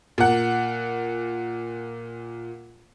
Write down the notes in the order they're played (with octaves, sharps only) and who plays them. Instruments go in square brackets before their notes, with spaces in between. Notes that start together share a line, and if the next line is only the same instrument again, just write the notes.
[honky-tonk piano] A#2 F#5